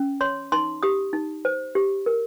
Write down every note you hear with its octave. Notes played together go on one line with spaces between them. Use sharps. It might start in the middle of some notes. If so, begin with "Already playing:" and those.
Already playing: C#4
C#5 C6
D#4 C6
G4 D#6
D#4
C5
G4
A#4